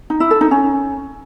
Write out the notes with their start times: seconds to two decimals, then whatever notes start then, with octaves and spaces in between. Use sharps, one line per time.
0.10 D#4
0.20 E4
0.31 A4
0.41 D#4
0.51 C#4